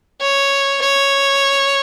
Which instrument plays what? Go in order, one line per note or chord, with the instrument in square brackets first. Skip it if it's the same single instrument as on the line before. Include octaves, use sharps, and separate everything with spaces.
[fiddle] C#5
C#5